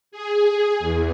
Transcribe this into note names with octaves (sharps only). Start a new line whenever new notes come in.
G#4
E2